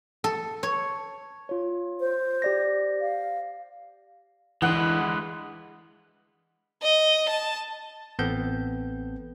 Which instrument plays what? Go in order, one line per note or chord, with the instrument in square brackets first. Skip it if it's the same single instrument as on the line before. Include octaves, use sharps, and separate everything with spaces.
[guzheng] A4
C#5
[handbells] F4 C#5
[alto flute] C5
[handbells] G4 D5 A#6
[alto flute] F5
[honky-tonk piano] D2 F#5 F#6 [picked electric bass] E3 [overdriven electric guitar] G#3 B4
[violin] D#5
A5
[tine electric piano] A1 B3 C4 A4 G6